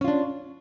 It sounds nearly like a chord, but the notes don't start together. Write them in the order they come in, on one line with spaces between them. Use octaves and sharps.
C#4 F4 D4